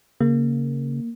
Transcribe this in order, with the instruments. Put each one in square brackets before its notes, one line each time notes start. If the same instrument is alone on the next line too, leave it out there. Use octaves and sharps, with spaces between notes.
[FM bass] C#3 [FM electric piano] A#3